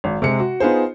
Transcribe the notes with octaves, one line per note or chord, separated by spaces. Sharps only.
G#1
C3 G#3 C#7
F#4
B3 D#4 F4 G#4 C5